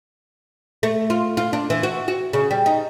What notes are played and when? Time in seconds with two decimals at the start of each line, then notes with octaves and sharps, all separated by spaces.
0.83 A3
1.10 F4
1.37 F4
1.53 D4
1.70 E3
1.83 F#4
2.08 F#4
2.33 C#3
2.51 G3
2.66 D#4